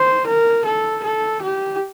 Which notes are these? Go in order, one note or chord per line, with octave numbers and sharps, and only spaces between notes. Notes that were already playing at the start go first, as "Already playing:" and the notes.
Already playing: C5
A#4
A4
A4
G4